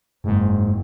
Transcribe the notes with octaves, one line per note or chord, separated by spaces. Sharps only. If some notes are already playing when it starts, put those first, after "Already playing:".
F#1 G#2